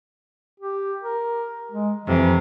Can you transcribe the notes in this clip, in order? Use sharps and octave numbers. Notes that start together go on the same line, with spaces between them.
G4
A#4
G#3
F2 C3 E3